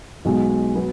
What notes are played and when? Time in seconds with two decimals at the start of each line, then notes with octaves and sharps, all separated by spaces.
0.25 B1 B2 G#3
0.75 F#3 B3